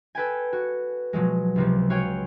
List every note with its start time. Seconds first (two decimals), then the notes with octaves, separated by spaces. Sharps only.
0.15 A4 B4 G5 G#5
0.53 F#4
1.13 B2 F3 F#3 G#3
1.56 C#2 C3 F3
1.90 F#4 C#5 F5 G5 G#5